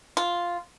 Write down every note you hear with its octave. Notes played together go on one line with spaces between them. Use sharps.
F4